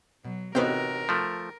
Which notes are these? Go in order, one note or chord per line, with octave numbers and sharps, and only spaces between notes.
B2 F#3
A1 C3 B3 D#4 F#4 A#4 C5 G5
F3 A3